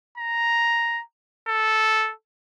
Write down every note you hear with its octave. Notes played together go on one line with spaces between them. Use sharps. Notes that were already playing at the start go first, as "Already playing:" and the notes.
A#5
A4